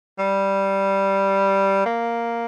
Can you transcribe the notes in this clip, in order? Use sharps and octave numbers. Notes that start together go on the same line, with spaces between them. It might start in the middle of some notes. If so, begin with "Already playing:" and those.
G3
A#3